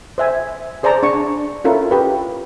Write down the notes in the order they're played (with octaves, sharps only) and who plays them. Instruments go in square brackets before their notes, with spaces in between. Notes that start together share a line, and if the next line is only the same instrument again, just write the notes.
[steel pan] C5 E5 G#5
G#4 C5 D5 A5 A#5
D4 C#6
C#4 E4 F4 A4 A#4
G4 B4